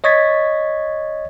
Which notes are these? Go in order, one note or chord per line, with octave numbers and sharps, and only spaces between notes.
C#5 D#5 C#6 G#6 A6 B6